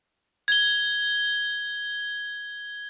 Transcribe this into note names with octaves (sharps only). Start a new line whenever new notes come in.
G#6 G7